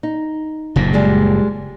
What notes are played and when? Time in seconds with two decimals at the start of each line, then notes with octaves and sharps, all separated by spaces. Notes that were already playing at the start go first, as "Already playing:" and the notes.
0.03 D#4
0.76 F#1 A#2
0.93 G3 G#3 G4